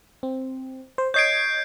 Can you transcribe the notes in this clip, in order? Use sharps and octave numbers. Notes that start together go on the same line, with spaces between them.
C4
C5
C#5 D#5 G6 G#6 C7 D7